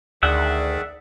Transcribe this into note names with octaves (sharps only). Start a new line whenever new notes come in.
D2 D#3 G#4 D5 E5 F#5